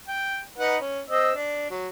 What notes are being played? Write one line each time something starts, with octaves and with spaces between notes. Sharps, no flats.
G5
D#4 B4 F#5
C#4
C4 D#5 E6
D4
F#3